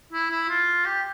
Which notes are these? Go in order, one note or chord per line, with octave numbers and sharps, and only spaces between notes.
E4
E4
F4
G4